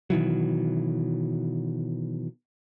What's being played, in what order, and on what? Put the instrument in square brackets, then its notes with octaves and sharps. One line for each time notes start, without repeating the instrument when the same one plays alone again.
[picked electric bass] B2 D#3 E3 F#3